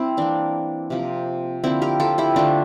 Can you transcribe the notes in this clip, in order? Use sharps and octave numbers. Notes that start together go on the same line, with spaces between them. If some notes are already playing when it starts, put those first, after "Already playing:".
Already playing: G3 C4 E4
E3 A#3 D4
C3 F3 A#3
D3 F3 A#3 C4 E4
G4 A#4
F4 A4
E4 G4
D3 A3 D4 F4